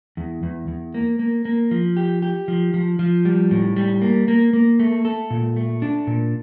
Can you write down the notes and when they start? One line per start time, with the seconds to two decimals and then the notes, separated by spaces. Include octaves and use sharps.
0.17 E2
0.43 E2
0.68 E2
0.94 A#3
1.19 A#3
1.45 A#3
1.71 F3
1.97 G4
2.22 G4
2.48 F3
2.74 F3
2.99 F3
3.25 G3
3.51 A2
3.76 G3
4.02 A#3
4.28 A#3
4.53 A#3
4.80 A3
5.05 A4
5.30 A#2
5.56 A3
5.82 D4
6.07 A#2